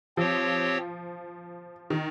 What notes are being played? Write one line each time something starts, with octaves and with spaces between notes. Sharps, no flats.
F3 C4 G4 C#5
D#3